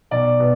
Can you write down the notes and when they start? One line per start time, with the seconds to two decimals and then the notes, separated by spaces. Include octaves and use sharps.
0.11 B1 D5
0.40 B2